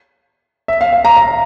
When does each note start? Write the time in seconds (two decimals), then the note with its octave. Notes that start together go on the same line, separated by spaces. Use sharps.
0.68 E5
0.81 F5
0.93 F5
1.05 A#5
1.17 A#5